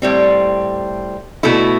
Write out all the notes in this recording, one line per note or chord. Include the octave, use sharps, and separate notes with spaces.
A2 G3 C4
B2 A3 E4